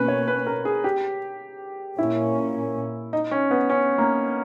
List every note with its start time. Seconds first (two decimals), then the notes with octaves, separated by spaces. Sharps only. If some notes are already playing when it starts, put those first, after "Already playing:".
Already playing: B2 A#3 C#4 B4
0.08 C#5
0.28 B4
0.47 A#4
0.65 G#4
0.84 G4
1.98 A#2 A#3 C#4 E4
3.13 D#4
3.31 C#4
3.51 B3
3.70 C#4
3.98 A#3